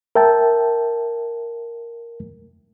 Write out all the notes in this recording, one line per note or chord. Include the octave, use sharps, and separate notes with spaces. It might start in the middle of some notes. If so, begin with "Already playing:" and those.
A#4 E5 G5 A5